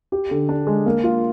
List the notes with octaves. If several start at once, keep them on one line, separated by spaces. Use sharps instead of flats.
G4
D3
D4
G#3
A#3
F4